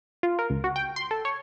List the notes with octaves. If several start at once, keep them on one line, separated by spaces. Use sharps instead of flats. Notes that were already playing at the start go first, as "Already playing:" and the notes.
F4
A#4
C#2
F#4
G5
C6
A4
C#5